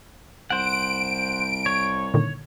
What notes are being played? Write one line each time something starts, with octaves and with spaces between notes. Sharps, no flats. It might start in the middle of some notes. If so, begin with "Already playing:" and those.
C2 C5 F#5 D7
C#5
A#2 D3 D#3